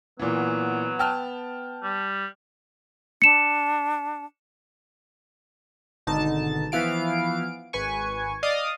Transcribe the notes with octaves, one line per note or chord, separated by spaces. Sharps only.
A#2 E3 F#3 B3
G5 A5 F6
G3
D4 C#7 E7
G#1 B2 D3 D#4 A5
E3 F3 B3 E4 F5 D7
G#1 B4 G#5 C#6
D5 D#5 F5 D#6